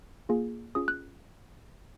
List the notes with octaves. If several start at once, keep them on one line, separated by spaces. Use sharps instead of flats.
A#3 F4 G#4
C#4 F4 G#4 D#6
F#6